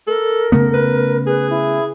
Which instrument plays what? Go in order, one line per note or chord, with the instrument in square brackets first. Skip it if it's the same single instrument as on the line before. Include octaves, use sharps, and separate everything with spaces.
[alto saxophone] A4 [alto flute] A#4
[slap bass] C#3 A3 B3
[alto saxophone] B4
[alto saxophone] G#4 [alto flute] B4
[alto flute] E4